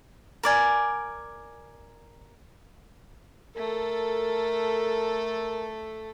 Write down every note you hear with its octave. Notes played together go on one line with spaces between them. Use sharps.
A#4 D5 G#5
A3 A4 A#4